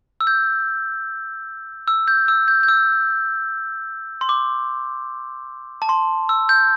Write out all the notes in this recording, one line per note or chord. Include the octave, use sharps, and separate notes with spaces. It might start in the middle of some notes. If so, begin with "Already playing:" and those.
E6
G6
E6
G6
E6
G6
G6
E6
C6
D6
A5
C6
E6
G6